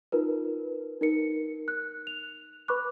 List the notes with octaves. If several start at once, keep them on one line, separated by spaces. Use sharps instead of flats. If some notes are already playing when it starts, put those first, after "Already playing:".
D#4 F4 A#4 B4
D#4 A#4 C#7
F#6
F7
B4 B5 C#6 D6 F#6